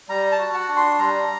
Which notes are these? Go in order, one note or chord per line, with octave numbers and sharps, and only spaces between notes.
G3 A#5
A5
F#4
F#5
D4
C6
G3 A#5